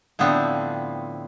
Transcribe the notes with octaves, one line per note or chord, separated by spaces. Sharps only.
A2 D3 F3 B3 C4